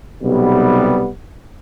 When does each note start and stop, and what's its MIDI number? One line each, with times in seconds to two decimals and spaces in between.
0.22 1.09 35
0.22 1.09 48
0.22 1.09 55
0.22 1.09 59